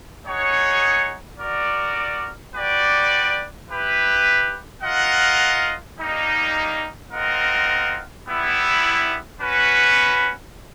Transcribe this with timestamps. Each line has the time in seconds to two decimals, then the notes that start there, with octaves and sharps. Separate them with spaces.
0.24 D#4 G#4 C#5 F#5
1.39 F#4 A#4 D5
2.53 F#4 B4 D5 G5
3.68 E4 G4 B4
4.82 F4 A#4 D#5 F#5
5.97 G3 A#3 D#4
7.11 C4 F4 A#4 D#5 F#5
8.26 G3 B3 E4
9.40 C#4 F#4 B4